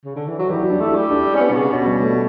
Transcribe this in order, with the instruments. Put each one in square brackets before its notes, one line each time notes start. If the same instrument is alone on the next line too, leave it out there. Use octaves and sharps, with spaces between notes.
[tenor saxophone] C#3
D3
E3
F#3
[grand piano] E3 [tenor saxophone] G3
[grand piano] F#3
D4
[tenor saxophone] A3 [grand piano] E4
[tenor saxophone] G3
[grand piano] D4
[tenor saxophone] C#4
B3
B2
C#3
[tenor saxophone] B2 [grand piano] C#4
[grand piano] G3
A3